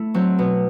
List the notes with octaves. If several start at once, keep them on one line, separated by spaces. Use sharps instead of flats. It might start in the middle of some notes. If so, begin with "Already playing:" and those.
Already playing: A3 E4
F#3 C4
B2